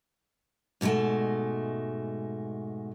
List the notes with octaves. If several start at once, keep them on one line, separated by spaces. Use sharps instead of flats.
G#2 B2 D3 G#3 A3